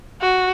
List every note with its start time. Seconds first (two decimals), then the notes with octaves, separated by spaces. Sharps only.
0.21 F#4